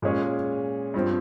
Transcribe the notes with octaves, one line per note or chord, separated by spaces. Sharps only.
A#2 G#3 C#4 G#4 C#5
G2 F3 C4